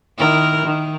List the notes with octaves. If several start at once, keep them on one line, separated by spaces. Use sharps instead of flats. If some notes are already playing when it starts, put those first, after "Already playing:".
D#3 E4 A#4
D#3